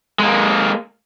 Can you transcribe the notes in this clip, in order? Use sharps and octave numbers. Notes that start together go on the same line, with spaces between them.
G#3 A#3